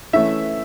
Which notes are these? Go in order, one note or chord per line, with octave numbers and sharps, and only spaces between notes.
E3 A3 C#4 E5